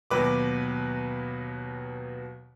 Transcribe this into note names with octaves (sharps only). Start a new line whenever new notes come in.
D#2 B2 F#3 B4 D6